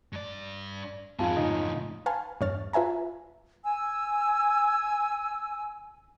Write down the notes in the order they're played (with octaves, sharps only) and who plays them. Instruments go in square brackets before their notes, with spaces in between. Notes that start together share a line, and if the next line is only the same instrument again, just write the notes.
[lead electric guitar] G2 D5
[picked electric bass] F2 G#2 [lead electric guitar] C4 G#4 [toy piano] F4 F5 A5
[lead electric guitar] A2 C#3 [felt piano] D#4
[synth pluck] B4 F5 G#5 A5 C6
E2 G2 C#5 F6 A6
F4 B4 E5 G#5 A#5
[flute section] G#5 E6